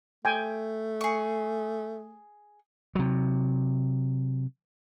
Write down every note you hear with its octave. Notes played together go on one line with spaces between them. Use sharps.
A3 G5 G#5
G#4 C#6
C3 F#3